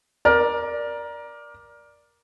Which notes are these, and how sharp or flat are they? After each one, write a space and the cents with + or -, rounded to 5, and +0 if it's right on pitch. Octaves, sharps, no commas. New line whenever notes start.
A#4 +15 D5 +0